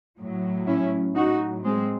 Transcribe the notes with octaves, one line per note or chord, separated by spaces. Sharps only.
A2 F#3
C#4 E4
A2 F#3 D#4 F#4
G#3 C4